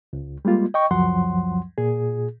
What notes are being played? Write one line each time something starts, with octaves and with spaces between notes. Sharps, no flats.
C#2
G3 G#3 A#3 F4
D#5 G5 C#6
C#2 F#2 F3 F#3 F#5 C6
A#2 G#4